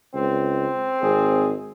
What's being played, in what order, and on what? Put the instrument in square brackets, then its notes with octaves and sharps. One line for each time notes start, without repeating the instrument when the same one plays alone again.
[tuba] C#2 [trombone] C4
[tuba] G#1 [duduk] G#4